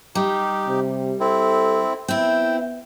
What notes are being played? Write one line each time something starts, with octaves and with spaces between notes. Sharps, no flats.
G3 D#4 G4
C3
C4 E4 A4
B3 C4 E4 G5